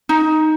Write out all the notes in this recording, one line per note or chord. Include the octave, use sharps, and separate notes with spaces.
D#4